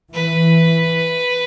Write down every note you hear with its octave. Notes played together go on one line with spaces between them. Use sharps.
E3 B4